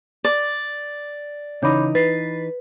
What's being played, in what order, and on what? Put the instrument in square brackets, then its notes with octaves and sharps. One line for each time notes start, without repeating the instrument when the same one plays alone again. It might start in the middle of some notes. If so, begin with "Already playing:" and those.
[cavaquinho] D5 [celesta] D6
[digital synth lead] C#3 [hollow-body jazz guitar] E3 D#4 [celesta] B5 D6 G6
[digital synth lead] B4 [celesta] A6 C7